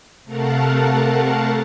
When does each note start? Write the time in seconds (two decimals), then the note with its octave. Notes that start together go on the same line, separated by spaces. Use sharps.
0.25 C3 A3 A#4 F5 F#5 A5